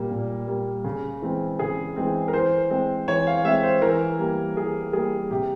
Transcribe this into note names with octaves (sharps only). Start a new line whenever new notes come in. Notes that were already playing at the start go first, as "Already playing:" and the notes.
Already playing: A#2 G3 A#3
A#2
G3 A#3
C#3
E3 G#3 C4
C#3 G#4
E3 G#3 C4
A#4
E3 C5
G#3 C4
E3 C#5
F5
G#3 C4 E5
C5
E3 A#4
G3 A#3
E3 G#4
G3 A#3 G#4
C3 G4